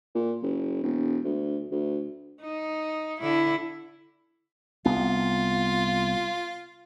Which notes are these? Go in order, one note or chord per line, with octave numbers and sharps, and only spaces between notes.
A#2
F#1
E1
D2
D2
D#4
D3 E4
C2 B3 F4